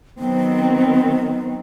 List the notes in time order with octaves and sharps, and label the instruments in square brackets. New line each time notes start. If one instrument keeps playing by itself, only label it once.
[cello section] D#3 F#3 C4 [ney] B3